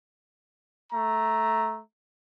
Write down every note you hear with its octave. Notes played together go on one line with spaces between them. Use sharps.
A3 A#5